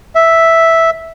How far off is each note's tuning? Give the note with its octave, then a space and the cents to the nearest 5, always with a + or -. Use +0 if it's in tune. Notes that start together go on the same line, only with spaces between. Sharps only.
E5 -5